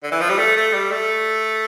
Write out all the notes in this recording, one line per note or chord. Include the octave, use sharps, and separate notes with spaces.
D3
E3
F3
G3
A3
A3
G3
A3